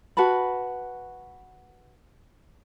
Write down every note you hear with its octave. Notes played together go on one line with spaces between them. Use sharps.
F#4 B4 A5 B5